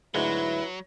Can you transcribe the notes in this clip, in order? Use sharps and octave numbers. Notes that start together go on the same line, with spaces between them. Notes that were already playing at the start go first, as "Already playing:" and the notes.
D2 G#2 F#3 G#3 E4 B4